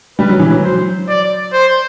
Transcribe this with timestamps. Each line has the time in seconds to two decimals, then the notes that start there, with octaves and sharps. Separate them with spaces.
0.19 G3 B4
0.29 F#3
0.39 E3
0.50 F#3
0.64 C5
1.09 D5
1.53 C5